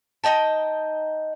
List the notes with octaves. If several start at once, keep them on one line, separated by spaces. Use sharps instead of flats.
D#4 D#5 G5 A5